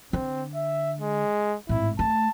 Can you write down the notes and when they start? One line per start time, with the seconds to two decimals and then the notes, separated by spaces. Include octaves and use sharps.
0.13 D3 C4
0.55 E5
1.00 G#3
1.69 G#1 A2 E4
1.99 A3 A5